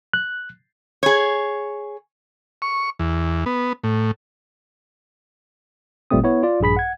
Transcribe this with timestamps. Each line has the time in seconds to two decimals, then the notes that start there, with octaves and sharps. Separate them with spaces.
0.13 F#6
1.03 G#4 C#5
2.62 C#6
2.99 E2
3.46 B3
3.84 A2
6.11 G#1 A#2 G3 A3 C4 D#6
6.24 B3 E4 C#5
6.43 F4 D5
6.60 A#1 G2 G#4 B5 B6
6.77 F#5 G#6